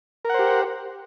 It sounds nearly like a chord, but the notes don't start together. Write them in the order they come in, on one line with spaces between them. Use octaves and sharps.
A#4 F#5 C5 G4